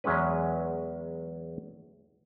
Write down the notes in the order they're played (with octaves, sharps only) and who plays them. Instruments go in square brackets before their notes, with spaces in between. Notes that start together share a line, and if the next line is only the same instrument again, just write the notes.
[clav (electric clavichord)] E2 F#3 G#3 C#4 B4